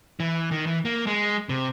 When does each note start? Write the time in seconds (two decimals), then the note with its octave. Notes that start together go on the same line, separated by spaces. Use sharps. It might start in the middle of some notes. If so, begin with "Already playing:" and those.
0.20 E3
0.51 D#3
0.67 E3
0.85 A#3
1.07 G#3
1.49 C3